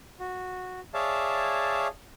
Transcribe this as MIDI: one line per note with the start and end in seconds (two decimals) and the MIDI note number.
0.19 0.80 66
0.94 1.88 68
0.94 1.88 73
0.94 1.88 74
0.94 1.88 76
0.94 1.88 77
0.94 1.88 81